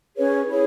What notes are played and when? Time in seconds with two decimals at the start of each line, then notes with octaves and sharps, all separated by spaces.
0.16 C#4 G#4 B4 C#5
0.48 E4 G#4 C#5